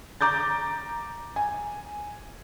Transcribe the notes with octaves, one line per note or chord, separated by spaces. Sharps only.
A#5 D6 G6 A6
G#5